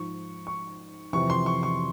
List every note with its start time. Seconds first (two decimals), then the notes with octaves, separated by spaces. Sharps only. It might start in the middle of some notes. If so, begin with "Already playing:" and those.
Already playing: G#2 F3 C#6
0.47 C#6
1.13 F2 C3 E3 C#6
1.30 C6
1.46 C#6
1.63 C#6